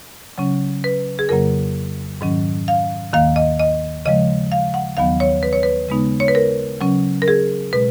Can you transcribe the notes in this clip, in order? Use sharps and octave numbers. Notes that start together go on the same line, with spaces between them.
C#3 F#3 C#4
B4
G#4
F2 C#3 F#3 A#3 A#4
G#2 D#3 F#3 C#4
F5
D#2 D#3 A#3 F5
D#5
D#5
C#3 F3 G#3 D#5
F5
F#5
D#2 D#3 F#3 B3 F5
C#5
B4
C#5
B4
C#3 G#3 B3 D#4
C#5
B4
A#4
C#3 F#3 C#4
A#4
G#4
B2 G#3 B4